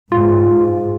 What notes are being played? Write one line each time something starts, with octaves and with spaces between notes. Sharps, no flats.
G#2 F4